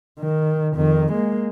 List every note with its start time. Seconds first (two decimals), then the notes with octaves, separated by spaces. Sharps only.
0.20 D#3
0.75 F2 D#3
1.13 G#3 A#3